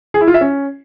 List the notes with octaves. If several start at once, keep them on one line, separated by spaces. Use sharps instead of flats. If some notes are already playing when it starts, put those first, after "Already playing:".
G#4
E4
F4
E5
C#4